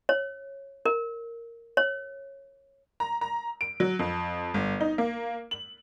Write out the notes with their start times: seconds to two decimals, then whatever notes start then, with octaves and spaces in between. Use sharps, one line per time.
0.09 C#5
0.86 A#4
1.77 C#5
3.00 A#5
3.21 A#5
3.61 D7
3.80 F#3
3.99 F2
4.54 G1
4.81 D#4
4.98 A#3
5.51 F#7